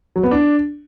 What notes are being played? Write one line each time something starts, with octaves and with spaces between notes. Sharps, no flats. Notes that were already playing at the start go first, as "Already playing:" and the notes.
F#3
B3
D4